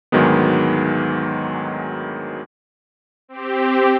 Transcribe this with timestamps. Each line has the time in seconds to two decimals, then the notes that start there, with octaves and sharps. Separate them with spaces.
0.12 D2 G#2 D#3 F#3 G#3 B3
3.29 C4 G4